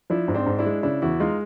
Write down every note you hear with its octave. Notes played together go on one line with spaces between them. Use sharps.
F3 D4 E4
G#2
C4 D4
G#2
D4 E4
G#3
C#3 D4 E4
E2 E4 F#4
G#3 D#4 F4